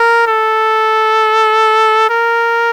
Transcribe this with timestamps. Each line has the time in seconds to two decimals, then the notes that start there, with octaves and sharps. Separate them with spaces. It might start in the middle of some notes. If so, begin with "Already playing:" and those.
Already playing: A#4
0.27 A4
2.10 A#4